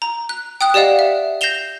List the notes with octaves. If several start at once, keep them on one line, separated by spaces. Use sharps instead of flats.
A#5
F#6
G5 D#6 F#6
G4 D5 D#5 F5 F#5
E5
G6 A#6 C7 E7 F7 G7